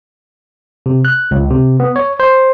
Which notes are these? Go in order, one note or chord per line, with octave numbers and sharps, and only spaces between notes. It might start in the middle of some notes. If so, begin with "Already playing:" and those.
C3
F#6
C#2
C3
B3
C#5
C5